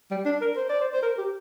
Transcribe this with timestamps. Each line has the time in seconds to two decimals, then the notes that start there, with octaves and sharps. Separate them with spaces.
0.11 G3
0.25 D4
0.41 A#4
0.56 C5
0.69 D5
0.81 C5
0.93 C5
1.02 A#4
1.18 G4